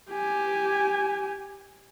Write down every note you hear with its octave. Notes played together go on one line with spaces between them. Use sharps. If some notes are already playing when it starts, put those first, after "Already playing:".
G4 G#5